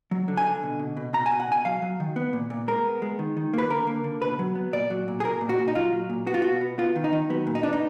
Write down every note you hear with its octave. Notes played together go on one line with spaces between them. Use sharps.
F#3
D3
G#5
D3
B2
B2
B2
B2 A#5
G#5
B2
F#5
B2 G#5
F#3 F5
F#3
D#3
B3
A#2
A#2
G#3 A#4
B3
G#3
D#3
D#3
A#3 B4
D3 A#4
A#3
D3
B2 B4
F#3
B3
A#2 D5
F#3
A#2
G#4
A#2 A#4
A#2
F#4
A#2
D#4
F#3 F4
F#3
A#2
B3 F#4
F4
B2 F#4
B3
B3 F4
D#3
D#4
D#3
F#3 B3
A#2
D#4
B3 D4
D#4